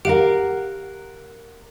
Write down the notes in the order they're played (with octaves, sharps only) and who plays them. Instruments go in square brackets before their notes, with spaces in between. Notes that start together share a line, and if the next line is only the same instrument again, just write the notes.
[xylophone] G4 D7 [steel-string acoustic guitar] A#4 F5 F#5